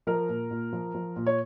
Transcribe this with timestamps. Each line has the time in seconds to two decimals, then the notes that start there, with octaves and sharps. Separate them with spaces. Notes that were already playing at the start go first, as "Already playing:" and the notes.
0.07 F3 A#4
0.29 A#2
0.51 A#2
0.73 F3
0.95 F3
1.16 A#2
1.26 C#5